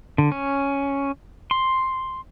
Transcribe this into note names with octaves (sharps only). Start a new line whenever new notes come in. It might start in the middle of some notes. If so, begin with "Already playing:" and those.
D3
C#4
C6